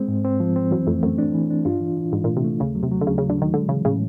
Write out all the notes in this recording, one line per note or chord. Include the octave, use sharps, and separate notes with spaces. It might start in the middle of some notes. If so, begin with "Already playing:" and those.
Already playing: G#3 C4
G#2
C4
F3
C4
F#2 E3
F2 A3
F#2 A3
D4
E3
D4
G2 F4
E3
E3
G#2 E3
A#2
A3
C3
A3
D#2 C#3
F#3
C3
F#3
D3
D#2 C#3
C#3
F#3
D3
D#3 F#3
D3 G#3
C#3 E3
A2 C#3